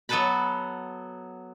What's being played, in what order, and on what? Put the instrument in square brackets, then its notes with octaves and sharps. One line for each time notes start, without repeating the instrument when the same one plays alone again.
[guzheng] F#3 B3 A4 B4 A5 B5